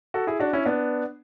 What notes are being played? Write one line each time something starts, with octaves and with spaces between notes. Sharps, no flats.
F#4 A4
E4 G#4
D4 F#4
C#4 E4
B3 D4